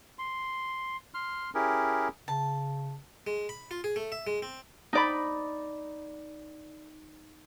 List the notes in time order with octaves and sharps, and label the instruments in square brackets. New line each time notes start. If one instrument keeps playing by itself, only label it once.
[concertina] C6
C6 F6
C#4 E4 G4 G#4 A#4
[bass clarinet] C#3 [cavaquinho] A5
[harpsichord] G#3
B5
F4
G#4
A3
E5
G#3
C4
[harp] D#4 D5 B5